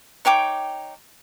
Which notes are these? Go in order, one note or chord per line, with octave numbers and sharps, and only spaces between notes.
D#4 C#5 G5 D6